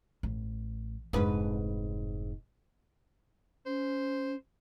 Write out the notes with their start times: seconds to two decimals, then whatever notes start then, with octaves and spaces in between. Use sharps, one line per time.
0.23 A1
1.13 F1 G#2 D4 B4
3.66 C#4 C5